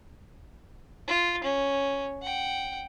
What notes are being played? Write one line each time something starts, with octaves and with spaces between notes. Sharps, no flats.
F4
C#4
F#5 G5